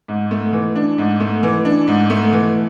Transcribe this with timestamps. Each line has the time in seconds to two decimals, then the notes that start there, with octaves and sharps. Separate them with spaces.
0.08 G#2
0.31 A3
0.53 E3
0.75 D4
0.98 G#2
1.20 A3
1.43 E3
1.65 D4
1.88 G#2
2.10 A3
2.33 E3